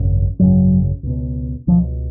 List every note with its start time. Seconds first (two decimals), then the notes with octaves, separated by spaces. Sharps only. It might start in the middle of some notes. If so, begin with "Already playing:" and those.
Already playing: G#1 F#2 C#3
0.39 G#1 F#2 C#3 F#3
1.03 C#2 B2
1.67 C#2 B2 F3